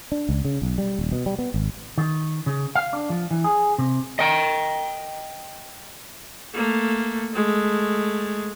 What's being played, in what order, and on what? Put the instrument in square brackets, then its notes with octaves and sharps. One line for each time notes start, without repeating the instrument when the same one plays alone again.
[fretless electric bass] D4
C#2
C#3
B1
G3
D#1
B2
G3
B3
G#1
[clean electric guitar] D#3
C#3
F5
D4
F3
E3
G#4
C3
D#5 G5
[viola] A3 A#3
G#3 A3